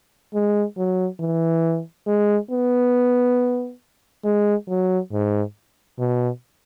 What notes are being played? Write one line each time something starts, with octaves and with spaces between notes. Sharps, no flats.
G#3
F#3
E3
G#3
B3
G#3
F#3
G#2
B2